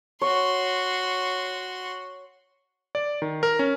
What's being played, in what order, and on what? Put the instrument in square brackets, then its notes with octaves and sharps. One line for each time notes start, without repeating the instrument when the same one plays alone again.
[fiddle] F#4 C6 [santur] C#5
[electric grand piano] D5
D#3
A#4
C#4